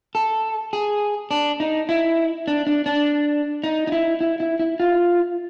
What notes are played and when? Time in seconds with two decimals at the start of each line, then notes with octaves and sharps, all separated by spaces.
0.15 A4
0.73 G#4
1.31 D4
1.60 D#4
1.89 E4
2.48 D4
2.67 D4
2.86 D4
3.64 D#4
3.87 D#4
3.92 E4
4.21 E4
4.40 E4
4.60 E4
4.80 F4